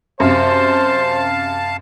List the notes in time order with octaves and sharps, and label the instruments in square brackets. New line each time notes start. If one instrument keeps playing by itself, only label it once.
[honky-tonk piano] F#2 C3 [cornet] C5 [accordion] F5 A5